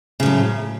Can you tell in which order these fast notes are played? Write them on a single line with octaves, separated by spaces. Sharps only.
C#3 A2 F#3